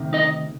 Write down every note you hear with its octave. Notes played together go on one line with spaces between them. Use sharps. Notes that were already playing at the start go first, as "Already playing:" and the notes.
Already playing: D2 C3 D#3
D#4 D#5